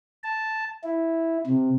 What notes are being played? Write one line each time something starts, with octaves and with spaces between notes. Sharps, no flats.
A5
E4
C3